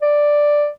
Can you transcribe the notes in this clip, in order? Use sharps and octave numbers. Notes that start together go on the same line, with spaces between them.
D5